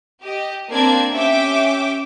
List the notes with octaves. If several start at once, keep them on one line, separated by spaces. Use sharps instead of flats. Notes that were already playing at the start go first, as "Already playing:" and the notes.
G4 D#5
A#3 C4 D4 D5 G#6
C#4 G4 E5 G5 D6